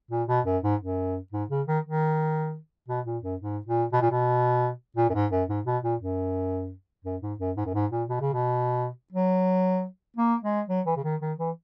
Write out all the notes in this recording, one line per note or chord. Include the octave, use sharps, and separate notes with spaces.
A#2
B2
F#2
G#2
F#2
G#2
C#3
D#3
D#3
B2
A#2
F#2
G#2
A#2
B2
A#2
B2
A#2
F#2
G#2
F#2
G#2
B2
A#2
F#2
F#2
G#2
F#2
G#2
F#2
G#2
A#2
B2
C#3
B2
F#3
A#3
G#3
F#3
E3
C#3
D#3
D#3
E3